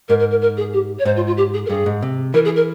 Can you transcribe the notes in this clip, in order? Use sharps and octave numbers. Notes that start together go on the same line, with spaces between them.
G#2 A#4
A#4
A#4
A#4
G#4
G4
C#5
G#2 C5
F4
F4
G4
G#4
A#4
G2 G#4
G#2
C3
E3 A#4
G#4
A#4